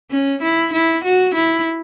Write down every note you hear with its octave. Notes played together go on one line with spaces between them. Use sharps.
C#4
E4
E4
F#4
E4